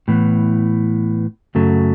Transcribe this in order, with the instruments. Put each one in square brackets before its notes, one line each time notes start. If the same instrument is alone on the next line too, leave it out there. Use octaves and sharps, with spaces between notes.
[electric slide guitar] A2 E3 B3
F#2 C#3 F#3 A3